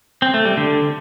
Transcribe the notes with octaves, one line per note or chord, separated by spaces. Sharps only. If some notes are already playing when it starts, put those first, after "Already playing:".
C4
A3
G3
D3